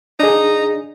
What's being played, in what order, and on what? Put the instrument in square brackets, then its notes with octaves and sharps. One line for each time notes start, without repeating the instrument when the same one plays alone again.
[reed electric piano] D4 G#4 [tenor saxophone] D#4